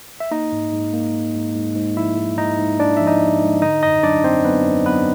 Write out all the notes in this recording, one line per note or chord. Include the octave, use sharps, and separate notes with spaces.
E5
A#3 D#4 D#5
G#2
G#2
A#3
A#3
G#2
G#2
G#2
F3 E4 E5
G#2
G#2 D#4 D#5
G#2
G#2 D4 D5
F3 E5
D#4 D#5
F3
G#2
D3 D#4 D#5
F#2 D#4 D#5
F#3 D4 D5
F#2 C4 C5
F#3 B3 B4
F#2
F#3 B3 B4